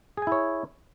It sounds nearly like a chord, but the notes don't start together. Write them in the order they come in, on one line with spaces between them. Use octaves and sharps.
G#4 G#5 E4 C#5